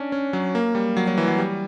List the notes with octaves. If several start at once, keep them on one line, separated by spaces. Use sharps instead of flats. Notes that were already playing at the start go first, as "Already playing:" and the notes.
Already playing: C#4 D4
C#4
F#3
A#3
G3
F#3
F#3
E3
F#3
G3